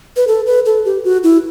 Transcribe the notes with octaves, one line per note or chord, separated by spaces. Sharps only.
B4
A4
B4
A4
G4
F#4
E4